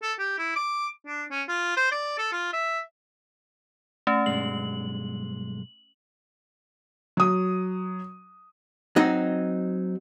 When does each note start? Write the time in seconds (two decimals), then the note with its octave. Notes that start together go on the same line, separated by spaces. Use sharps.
0.03 A4
0.19 G4
0.39 E4
0.56 D6
1.07 D4
1.31 C#4
1.49 F4
1.77 C5
1.92 D5
2.18 A4
2.32 F4
2.53 E5
4.07 A3 C#4
4.26 B1 G2 G#3 F#7
7.17 F#3 D#6
8.96 F#3 C4 D#4